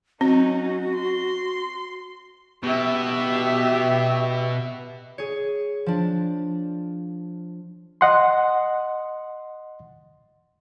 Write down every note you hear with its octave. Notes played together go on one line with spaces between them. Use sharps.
F#3 C4 C#4 D#4 F#4
C6
B2 G4 E5
G#4 C#5
F3 D4
D#5 F#5 C6